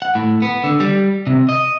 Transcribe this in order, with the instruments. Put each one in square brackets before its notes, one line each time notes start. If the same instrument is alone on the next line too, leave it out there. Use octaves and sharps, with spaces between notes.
[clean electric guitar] F#5
A2
B3
D3
G3
C3
D#5